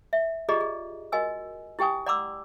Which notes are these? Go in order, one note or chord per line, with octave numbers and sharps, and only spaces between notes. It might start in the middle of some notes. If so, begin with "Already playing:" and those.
E5
F4 G4 G#4 D5 D#5 A#5
G#4
F#4 A#4 D#5 G#5 E6
E4 G4 G5 G#5 D#6
D5 F#5 A#5 C6 D6 E6